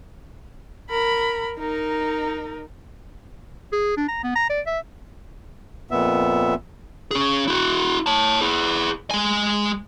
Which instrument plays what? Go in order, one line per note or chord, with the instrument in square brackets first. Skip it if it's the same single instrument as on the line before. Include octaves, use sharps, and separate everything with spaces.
[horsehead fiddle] A#4 B5
D#4 A#4
[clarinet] G#4
D4
A#5
B3
A#5
D5
E5
[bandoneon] F2 A#2 B3 E5
[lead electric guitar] C#4 G#4
E4 F#4
C#5 A5
E4 G#4
G#3 G#5